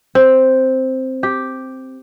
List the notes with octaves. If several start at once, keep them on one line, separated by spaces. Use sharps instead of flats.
C4
G4